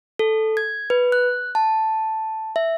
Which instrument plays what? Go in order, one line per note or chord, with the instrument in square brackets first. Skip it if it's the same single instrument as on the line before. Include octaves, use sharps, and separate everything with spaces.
[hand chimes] A4
G#6
B4
F#6
A5
E5